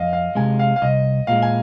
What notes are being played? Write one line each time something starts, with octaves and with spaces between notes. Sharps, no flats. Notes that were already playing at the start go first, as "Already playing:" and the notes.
Already playing: F2 D#5 F5
F5
C3 G#3 G#5
F5
F5
C2 D#5
A#2 G#3 F5
G#5